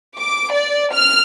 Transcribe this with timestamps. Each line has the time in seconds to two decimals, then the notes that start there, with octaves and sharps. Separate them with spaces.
0.17 D6
0.53 D5
0.93 F6